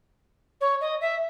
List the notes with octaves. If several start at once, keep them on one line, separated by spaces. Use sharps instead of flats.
C#5
D#5
E5